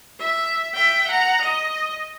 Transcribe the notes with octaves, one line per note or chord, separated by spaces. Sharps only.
E5
E5 G5
F#5 A#5
D#5